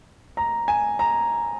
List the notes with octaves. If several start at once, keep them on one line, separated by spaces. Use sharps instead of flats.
A#5
G#5
A#5